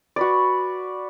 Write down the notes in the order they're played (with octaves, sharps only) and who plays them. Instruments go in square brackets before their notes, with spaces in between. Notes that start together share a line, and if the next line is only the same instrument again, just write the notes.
[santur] F#4 B4 D5